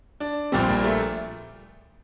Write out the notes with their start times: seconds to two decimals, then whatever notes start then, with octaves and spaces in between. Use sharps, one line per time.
0.20 D4
0.52 A#1 A#2 G3 C4
0.68 A#3
0.84 A3